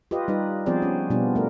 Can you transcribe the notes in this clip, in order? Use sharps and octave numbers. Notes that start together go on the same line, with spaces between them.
F4 G4 B4 D#5
G3 D#4 B4
F3 B3 C4 G#4 C5 D5
C#4
B2 G3 B3 D4 F4
A3 A#4